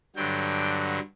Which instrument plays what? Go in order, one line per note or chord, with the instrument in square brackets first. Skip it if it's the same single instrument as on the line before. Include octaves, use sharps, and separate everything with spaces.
[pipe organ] G2 D3 F#3 G5